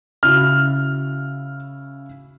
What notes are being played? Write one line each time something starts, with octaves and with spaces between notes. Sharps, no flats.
C#3 E4 F#4 F6